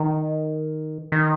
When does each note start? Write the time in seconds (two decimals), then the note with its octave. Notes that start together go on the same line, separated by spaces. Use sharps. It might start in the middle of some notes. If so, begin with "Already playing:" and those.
Already playing: D#3
1.12 D#3